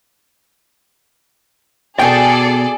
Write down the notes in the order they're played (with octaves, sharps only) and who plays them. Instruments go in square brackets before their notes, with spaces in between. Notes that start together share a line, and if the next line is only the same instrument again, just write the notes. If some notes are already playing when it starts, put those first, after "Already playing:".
[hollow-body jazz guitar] B2 G5 [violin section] G#4 A4 D5